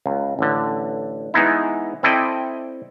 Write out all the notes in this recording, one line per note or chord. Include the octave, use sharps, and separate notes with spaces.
C#2
A1 D3
E3 G#3 B3 D#4 E4
C4 E4 A4 D5 D#5 G5